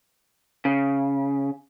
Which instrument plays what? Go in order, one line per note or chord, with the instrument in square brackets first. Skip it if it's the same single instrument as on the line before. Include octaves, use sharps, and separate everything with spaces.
[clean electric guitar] C#3